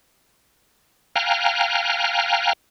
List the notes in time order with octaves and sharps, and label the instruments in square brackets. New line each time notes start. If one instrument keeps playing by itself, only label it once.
[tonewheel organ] F5 G5 G#5 A#5 F6 F#6